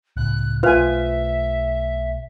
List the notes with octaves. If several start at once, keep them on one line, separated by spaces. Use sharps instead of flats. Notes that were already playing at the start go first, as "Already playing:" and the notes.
C#2 A2 F#6
B1 A3 F4 B4 C5 E5 G#5